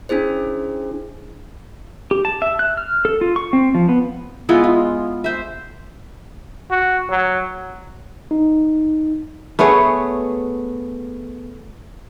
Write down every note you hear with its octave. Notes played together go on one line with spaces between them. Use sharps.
C#4 D4 E4 G#4 C5
G4
A5
E5
F#6
F6
A4
F4
C#6
C4
F3
B3
G#3 B3 E4 F4
F4
C5 E5
F#4
F#3
D#4
A3 B3 G#4 C#5